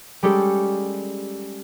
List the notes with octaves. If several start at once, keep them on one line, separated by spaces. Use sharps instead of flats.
G3 G#3 C#4 G4 A4